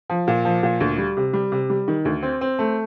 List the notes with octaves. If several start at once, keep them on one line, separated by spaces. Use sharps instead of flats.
F3
A#2
F3
A#2
D2
G3
C3
G3
C3
G3
D#3
D2
C4
C4
A3